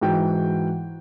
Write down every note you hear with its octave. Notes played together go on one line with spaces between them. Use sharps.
G#2 E3 F#4 G5